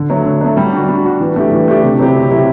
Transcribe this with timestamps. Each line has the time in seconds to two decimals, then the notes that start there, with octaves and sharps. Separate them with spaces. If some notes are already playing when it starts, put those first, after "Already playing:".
Already playing: D3
0.10 F#3 A3
0.25 D3
0.41 F#3 A3
0.57 G3
0.73 D4 F#4
0.89 G3
1.04 D4 F#4
1.21 E3
1.36 A3 D4 G4
1.52 E3
1.68 A3 D4 G4
1.83 C3
1.99 F#3 C4 E4 G4
2.15 C3
2.31 F#3 C4 E4 G4